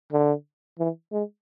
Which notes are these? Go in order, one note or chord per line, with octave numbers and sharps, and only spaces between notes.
D3
E3
G#3